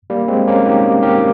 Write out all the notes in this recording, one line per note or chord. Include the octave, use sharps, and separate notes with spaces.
G3 A#3
G#3 C4
A#3 C#4
D#4 G4
G4 A#4